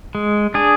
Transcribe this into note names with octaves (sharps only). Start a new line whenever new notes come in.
G#3
D4 G#4